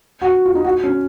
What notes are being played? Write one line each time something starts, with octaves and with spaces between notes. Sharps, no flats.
F#4
F4
D#4
F#4
C#4